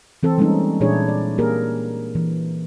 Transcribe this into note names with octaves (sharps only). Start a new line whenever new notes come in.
E3 C4 A4
G3 G#3 A#3 C4 C#4 D#4
A#2 E3 D4 E4 G#4 C#5
D5
A#3 G4 G#4 A#4
E3